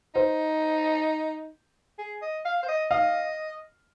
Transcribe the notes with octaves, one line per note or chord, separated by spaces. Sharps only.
D#4 C5
G#4
D#5
F5
C5
D#5
D#5 F5